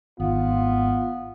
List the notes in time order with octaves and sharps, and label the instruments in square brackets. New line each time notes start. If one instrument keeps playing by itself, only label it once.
[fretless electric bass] G#1 D#3 [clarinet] B3 [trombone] F4